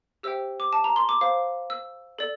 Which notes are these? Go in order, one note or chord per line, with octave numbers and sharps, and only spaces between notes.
G4 C5 E5 G5 E6
D6
A5
A#5
C6
D6
C5 F5
E6
A4 D5